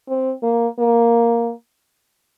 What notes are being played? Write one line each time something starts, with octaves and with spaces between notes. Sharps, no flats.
C4
A#3
A#3